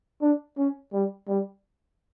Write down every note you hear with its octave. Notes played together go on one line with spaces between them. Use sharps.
D4
C#4
G3
G3